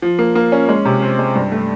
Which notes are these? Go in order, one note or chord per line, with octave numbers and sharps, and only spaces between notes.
F3
A#3
A#3
C#4
G#3
C3
C4
G#3
G2
A3